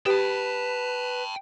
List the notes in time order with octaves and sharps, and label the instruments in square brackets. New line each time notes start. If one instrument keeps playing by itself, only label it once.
[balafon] G4 [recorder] B4 [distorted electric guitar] G5 A5